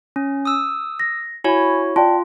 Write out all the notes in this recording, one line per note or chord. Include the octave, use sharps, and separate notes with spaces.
C#4
D#6 E6
A#6
E4 F#4 C#5 G#5 B5
F4 D5 G5 A5